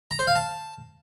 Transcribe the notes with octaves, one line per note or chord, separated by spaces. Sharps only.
A#5
C5
F5
A5